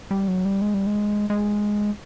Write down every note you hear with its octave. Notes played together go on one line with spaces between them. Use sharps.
G3
F#3
G3
G#3
G3
G#3
G#3